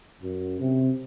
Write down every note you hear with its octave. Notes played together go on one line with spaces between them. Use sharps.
F#2
C3